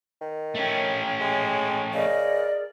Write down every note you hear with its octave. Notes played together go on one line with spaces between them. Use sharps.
D#3
A3 C#4 C#5 G5
G#3
C#3 G#4 A#4 D5 D#5